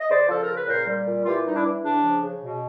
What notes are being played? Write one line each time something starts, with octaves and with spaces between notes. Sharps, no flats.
D#5
C#3 C5 D5
F3 A4
A#4
C#3
B4
A#2 A#4 C5
G3
A#2
E3 F4 G4
G3 D#4
D4 E4
E3
C#3 D4
F3
C#3
B2